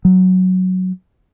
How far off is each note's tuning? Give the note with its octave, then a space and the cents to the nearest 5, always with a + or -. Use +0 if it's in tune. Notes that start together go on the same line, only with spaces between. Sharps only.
F#3 +0